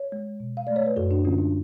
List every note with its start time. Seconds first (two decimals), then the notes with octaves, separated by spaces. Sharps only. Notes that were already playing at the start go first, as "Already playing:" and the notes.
Already playing: C#5
0.12 G#3
0.40 B2
0.57 F5
0.67 A3 D5
0.76 C#5
0.86 B4
0.96 F#2 F#4 A4
1.11 D4 F#4
1.24 D3 G#3 C#4 F4
1.38 D4